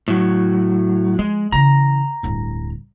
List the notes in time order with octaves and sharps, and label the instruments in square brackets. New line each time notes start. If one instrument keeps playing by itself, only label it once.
[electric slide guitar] A2 F#3
[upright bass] F3 [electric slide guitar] G#3
[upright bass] C#3 E3 [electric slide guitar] A#5
[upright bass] D1 G2